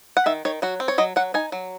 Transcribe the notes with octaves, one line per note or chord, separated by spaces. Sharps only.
F#5
D#3 E5
D#3 C#5
F#3 F#4
C4
C#5
F#3 D#5
F#3 F#5
D#4 G#5
F#3